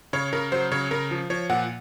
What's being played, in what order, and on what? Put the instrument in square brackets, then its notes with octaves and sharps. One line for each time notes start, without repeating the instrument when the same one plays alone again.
[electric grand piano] C#3 C#5
C#3 A#4
F#3 C5
C#3 C#5
C#3 A#4
F3
F3 C#5
A#2 F#5